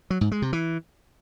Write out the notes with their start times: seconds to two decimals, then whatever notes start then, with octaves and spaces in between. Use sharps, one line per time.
0.10 F#3
0.21 G#2
0.32 G#3
0.42 C3
0.53 E3